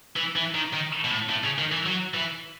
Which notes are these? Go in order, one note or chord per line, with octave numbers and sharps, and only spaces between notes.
E3
E3
D#3
D#3
B2
A2
A2
C#3
D#3
E3
F#3
E3